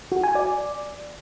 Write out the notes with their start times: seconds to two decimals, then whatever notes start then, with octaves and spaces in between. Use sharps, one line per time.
0.12 F#4
0.23 G#5
0.35 D5